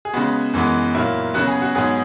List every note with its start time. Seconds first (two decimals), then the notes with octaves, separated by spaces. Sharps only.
0.05 G#4
0.13 C#3 G#3 B3 F#4
0.54 F#2 E3 G#3 B3
0.95 A#2 F#3 A#3 E4
1.34 C#3 F#3 B3 F#4
1.47 G#4
1.62 F#4
1.75 G#2 F#3 B3 G#4